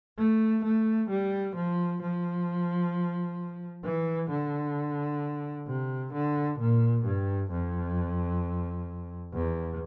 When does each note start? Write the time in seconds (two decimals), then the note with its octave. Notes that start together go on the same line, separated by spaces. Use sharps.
0.18 A3
0.65 A3
1.10 G3
1.56 F3
2.02 F3
3.84 E3
4.30 D3
5.67 C3
6.13 D3
6.59 A#2
7.05 G2
7.51 F2
9.34 E2